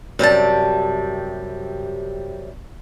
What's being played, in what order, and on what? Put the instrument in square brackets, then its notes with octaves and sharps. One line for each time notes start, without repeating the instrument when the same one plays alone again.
[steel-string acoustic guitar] F#2 C3 G3 A5